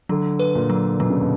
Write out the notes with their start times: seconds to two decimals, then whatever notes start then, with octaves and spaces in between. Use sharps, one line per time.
0.09 D3 F#3
0.39 B4
0.55 A#2
0.70 F#3
0.99 B2 F#3
1.10 C#3
1.21 B2